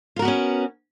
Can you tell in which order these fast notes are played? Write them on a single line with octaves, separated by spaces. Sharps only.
F4 A#4 F#4 B3 C#4